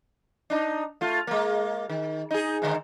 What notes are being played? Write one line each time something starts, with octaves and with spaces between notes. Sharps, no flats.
D4 D#4
A3 F4
G#3 A#3
D#3
D#4 G#4
G#2 D3 D#3